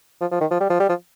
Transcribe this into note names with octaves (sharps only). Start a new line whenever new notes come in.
F3
F3
D#3
F3
G3
F3
G3
F3